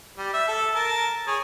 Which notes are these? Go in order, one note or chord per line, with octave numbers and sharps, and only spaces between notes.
G3
E5
A4
A#4 A5
G#4 C#5